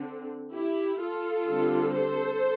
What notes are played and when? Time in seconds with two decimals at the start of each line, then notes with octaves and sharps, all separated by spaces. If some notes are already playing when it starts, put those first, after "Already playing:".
Already playing: D3 C4
0.52 E4 G4
0.99 F4 A4
1.47 D3 G3 C4
1.94 A4 C5